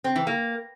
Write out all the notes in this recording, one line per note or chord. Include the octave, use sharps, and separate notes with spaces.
C4
E3
A#3